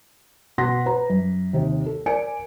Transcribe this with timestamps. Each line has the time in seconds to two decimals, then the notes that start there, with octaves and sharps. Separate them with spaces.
0.58 B2 F#5 C6 A#6 B6
0.86 B4 A#5
1.10 F#2
1.53 D#2 C3 D#4
1.86 A4
2.06 A#4 D5 G#5 C#7 D7